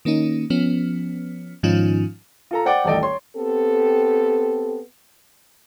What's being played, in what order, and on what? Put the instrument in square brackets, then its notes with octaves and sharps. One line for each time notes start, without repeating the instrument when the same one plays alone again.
[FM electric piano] D#3 A#3 C#4 D#4
F3 B3 C#4
G#2 D#3 F3 C#4 D#4 F4
[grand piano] F4 A4 A#5
C5 D5 F#5 G5 D6 A6
D#1 A1 A4 D5 D#5 G5
C#5 C6
[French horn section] B3 C4 G4 A4